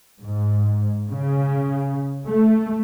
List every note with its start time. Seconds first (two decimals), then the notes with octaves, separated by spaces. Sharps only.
0.21 G#2
1.11 C#3
2.26 A3